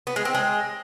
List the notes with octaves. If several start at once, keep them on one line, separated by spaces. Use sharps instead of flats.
B3
G#3
C4
G#3